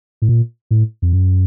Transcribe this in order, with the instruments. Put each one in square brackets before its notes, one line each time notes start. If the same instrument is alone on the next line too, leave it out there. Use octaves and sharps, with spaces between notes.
[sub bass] A2
A#2
A2
F2
F#2